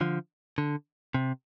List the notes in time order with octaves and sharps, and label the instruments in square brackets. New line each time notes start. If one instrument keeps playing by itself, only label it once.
[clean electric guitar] D3 F3
D3
C3